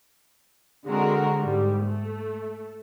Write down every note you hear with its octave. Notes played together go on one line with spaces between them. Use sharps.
D3 G#3 C4 F#4 A#4
G#2 G3
A3